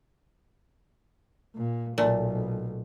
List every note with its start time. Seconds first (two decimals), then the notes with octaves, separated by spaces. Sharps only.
1.56 A#2
1.98 B1 A#2 A3